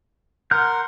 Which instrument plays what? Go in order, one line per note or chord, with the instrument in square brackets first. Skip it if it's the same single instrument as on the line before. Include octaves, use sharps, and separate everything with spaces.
[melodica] A#4 F#5 C6 [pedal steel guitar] F6 G6